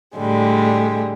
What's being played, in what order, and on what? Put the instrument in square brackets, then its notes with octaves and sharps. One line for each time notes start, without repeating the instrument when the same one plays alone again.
[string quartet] A2 D3 G3 G#3